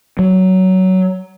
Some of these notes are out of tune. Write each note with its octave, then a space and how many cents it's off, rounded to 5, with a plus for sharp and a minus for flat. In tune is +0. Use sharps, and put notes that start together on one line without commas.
F#3 +15